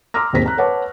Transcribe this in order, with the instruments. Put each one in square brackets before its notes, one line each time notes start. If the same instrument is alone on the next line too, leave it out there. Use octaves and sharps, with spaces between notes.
[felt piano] A#5 C6 D6 E6 F6 A#6
D#2 G#2 C4 A#6 B6
A#5 F#6
B4 C#5 F#5 A5 D6